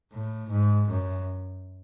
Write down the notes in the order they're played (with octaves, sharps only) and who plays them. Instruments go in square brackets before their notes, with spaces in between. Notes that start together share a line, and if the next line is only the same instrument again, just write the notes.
[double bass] A2
G#2
F#2